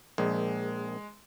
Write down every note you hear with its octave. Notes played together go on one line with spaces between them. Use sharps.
A#1 G#3